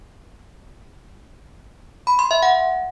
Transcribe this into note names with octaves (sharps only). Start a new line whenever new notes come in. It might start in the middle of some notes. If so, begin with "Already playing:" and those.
B5
C6
E5
F#5